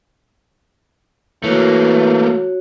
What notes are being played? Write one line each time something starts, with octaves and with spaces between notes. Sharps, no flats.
E3 A3 A#3 F#4 C#5